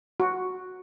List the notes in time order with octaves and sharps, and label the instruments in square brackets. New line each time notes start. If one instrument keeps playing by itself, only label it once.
[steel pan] F#4